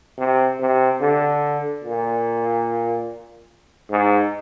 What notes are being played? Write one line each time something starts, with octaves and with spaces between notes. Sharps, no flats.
C3
C3
D3
A#2
G#2